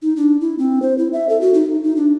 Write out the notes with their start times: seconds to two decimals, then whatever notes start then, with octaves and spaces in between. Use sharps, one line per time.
0.02 D#4
0.17 D4
0.41 E4
0.59 C4
0.82 C5
0.98 E4
1.13 E5
1.29 A4
1.41 F#4
1.54 D#4
1.84 D#4
1.96 D4